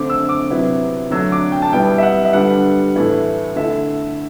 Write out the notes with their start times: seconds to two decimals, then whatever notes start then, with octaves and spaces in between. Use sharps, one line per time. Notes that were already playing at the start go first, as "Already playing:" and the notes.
Already playing: D3 A3 C4 D6
0.10 E6
0.29 D6
0.50 C3 F#3 B3 E4
1.11 D3 F#3 A3 D4 E6
1.32 D6
1.52 G5
1.62 A5
1.72 B2 G3 B3 E4 G5
1.98 E5
2.03 F#5
2.25 E5
2.33 D3 G3 B3 D4 F#5
2.96 A2 E3 A3 E4
3.56 D3 A3 E4 E5